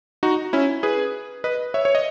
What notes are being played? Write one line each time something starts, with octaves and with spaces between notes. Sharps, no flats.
D#4 F#4
C#4 E4
G#4 B4
B4 D#5
C#5 E5
C#5
D#5